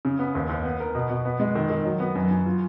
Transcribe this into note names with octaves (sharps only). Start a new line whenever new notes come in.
C#3
B3
D#2
D#2
B3
A#4
B2
B2
B3
G#3
D#3
D#3
F#3
B3
F#2
F#2
F4